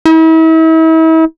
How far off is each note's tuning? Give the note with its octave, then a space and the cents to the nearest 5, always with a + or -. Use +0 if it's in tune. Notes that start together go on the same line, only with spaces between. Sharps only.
E4 -40